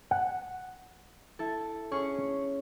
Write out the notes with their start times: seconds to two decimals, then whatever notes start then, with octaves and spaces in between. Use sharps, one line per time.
0.11 F#5
1.39 E4 A4
1.91 C#4 G#4 C#6